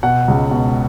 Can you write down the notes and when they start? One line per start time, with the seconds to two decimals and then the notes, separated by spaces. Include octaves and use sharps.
0.03 B2 F#5
0.28 C#2
0.51 B2